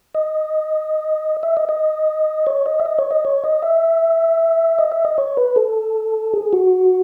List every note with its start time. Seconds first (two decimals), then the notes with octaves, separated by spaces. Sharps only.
0.15 D#5
1.43 E5
1.57 D#5
1.69 D#5
2.47 C#5
2.66 D#5
2.80 E5
2.85 D#5
2.99 C#5
3.11 D#5
3.25 C#5
3.44 D#5
3.62 E5
4.79 D#5
4.92 E5
5.05 D#5
5.18 C#5
5.37 B4
5.56 A4
6.34 G#4
6.53 F#4